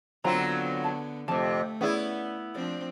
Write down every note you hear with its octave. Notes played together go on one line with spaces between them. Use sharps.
D3 F#3 B3 C4 F4 A#5
A5
F2 C3 A3 A5
B3 C#4 E4 G#4 D5
F3 C4 D4 D5